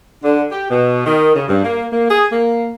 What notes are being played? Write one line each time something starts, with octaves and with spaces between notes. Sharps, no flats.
D3
G4
B2
D#3
C#3
G2
A#3
A#3
G#4
A#3